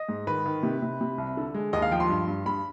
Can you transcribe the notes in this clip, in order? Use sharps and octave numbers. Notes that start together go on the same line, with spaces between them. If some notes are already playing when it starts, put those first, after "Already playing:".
Already playing: D#5
G#2
D#3 B4
D#3
C3
C3
C3
C2
D3
G#3
D#2 D#5
F5
F3 G5
C6
G2
G2
G2 B5